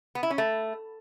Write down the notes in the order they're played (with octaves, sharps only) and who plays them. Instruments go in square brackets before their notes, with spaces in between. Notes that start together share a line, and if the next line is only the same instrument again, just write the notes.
[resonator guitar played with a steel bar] B3
E4
C#4
A3